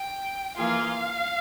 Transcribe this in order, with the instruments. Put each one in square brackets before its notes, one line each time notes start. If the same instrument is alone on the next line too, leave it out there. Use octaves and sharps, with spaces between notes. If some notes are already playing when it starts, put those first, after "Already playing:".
Already playing: [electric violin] G5
[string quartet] E3 A#3 F4 G#4 [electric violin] F5